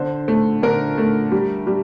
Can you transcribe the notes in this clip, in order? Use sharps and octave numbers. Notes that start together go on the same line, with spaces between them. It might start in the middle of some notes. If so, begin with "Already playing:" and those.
Already playing: D3 C5
A3
D3 A#4
A3
G3
G3